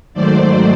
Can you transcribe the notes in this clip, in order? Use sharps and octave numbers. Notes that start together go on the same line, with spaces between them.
G#2 D#3 F#3 A3 C5 D5